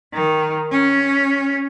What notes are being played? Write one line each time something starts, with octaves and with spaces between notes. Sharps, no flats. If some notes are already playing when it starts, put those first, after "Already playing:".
D#3
C#4